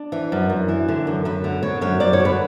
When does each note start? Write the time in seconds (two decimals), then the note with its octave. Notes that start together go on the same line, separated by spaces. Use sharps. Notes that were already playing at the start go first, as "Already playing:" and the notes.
Already playing: D4
0.12 E3
0.32 F#2
0.50 F#2
0.68 E3
0.88 D3
1.07 F#2
1.25 F#2 B4
1.44 D3
1.63 D3 C#5
1.81 F#2 C#5
2.00 F#2 D5
2.13 C#5
2.20 D3
2.25 B4